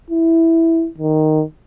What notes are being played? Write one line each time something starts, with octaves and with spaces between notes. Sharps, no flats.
E4
D#3